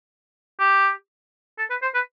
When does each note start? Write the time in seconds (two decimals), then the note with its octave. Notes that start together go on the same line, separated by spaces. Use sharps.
0.60 G4
1.58 A4
1.70 B4
1.82 C5
1.94 B4